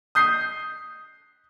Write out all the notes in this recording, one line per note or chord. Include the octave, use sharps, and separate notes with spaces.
D#6 G6 C7